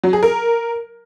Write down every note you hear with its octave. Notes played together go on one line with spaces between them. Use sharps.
F#3
G#4
A#4